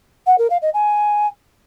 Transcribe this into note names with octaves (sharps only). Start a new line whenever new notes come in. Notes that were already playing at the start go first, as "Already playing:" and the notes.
F#5
A#4
F5
D#5
G#5